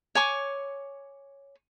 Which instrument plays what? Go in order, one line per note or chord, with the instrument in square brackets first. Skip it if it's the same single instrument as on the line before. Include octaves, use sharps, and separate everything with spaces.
[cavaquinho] C#5 G#5 C#6 D6